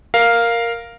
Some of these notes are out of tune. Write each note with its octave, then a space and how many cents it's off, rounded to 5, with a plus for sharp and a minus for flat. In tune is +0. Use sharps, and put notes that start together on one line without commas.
A#4 +0 F5 +0